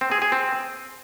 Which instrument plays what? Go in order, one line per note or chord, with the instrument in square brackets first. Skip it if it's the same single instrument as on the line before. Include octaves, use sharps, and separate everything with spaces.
[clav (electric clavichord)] C4
G#4
G#4
C4